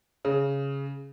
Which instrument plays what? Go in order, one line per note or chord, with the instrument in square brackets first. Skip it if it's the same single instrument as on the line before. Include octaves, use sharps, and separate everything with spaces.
[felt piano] C#3